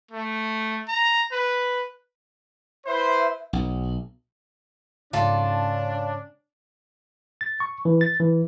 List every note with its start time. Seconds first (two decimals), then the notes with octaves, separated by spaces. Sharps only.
0.11 A3
0.88 A#5
1.32 B4
2.86 E4 B4 C5 E5
3.53 B1
5.13 G#2 C#3 C#4 D4 F4 A4 D5
7.41 A6
7.60 C#6
7.85 E3
8.01 A6
8.20 E3